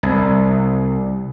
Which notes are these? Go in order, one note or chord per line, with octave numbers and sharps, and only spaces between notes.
C2